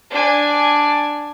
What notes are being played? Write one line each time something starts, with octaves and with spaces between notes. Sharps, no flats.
D4 G#5